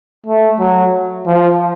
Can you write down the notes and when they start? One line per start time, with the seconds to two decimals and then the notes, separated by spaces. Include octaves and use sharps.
0.26 A3
0.59 F#3
1.27 F3